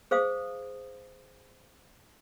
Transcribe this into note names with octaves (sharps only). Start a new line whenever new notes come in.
G#4 C5 F5 D#6